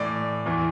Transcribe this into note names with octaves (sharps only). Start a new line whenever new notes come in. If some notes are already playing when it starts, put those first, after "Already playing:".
Already playing: A2 E3 D5
E2 E3